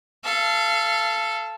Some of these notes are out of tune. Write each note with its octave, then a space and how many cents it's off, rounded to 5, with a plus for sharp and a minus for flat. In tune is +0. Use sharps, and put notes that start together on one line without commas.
A4 -5 F5 -30